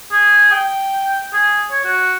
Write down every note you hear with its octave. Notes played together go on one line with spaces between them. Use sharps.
G#4
G5
G#4
C#5
F#4